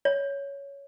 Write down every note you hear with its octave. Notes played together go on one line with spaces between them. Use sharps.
C#5